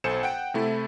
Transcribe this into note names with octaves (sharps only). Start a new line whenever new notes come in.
B1 A4 C5 G#5 C#7 E7
F#5 G5 D7
C3 A3 E4 A4